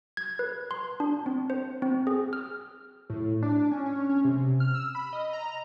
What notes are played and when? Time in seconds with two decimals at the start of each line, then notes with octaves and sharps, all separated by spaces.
0.17 G#6
0.39 B4
0.71 C6
1.00 D4
1.26 C4
1.50 C5
1.82 C4
2.07 G#4
2.33 F6
3.10 A2
3.42 D4
3.71 C#4
3.86 C#4
4.09 C#4
4.25 C3
4.60 F6
4.75 E6
4.95 B5
5.13 D#5
5.33 A#5